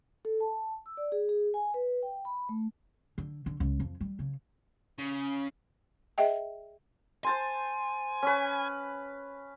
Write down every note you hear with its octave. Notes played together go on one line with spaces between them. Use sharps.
A4
A5
E6
D5
G#4
G#4
G#5
B4
G5
B5
A3
D3
D3
C#2
F2
G3
C#3
C#3
G#4 D#5 E5 G5
C5 G#5 A5 C6
C#4 B4